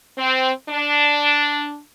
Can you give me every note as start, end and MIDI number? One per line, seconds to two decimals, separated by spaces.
0.18 0.50 60
0.69 1.80 62